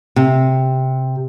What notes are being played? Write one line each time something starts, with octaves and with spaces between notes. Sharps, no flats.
C3